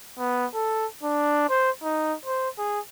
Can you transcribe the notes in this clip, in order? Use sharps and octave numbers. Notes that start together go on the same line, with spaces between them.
B3
A4
D4
C5
D#4
C5
G#4